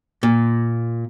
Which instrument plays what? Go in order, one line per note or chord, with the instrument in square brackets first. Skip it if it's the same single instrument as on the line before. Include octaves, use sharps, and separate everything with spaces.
[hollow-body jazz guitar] A#2